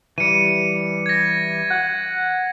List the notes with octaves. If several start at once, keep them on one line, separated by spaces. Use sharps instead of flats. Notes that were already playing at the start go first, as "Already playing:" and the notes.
E3 G3 C#7 D#7
G#6 A#6
F#5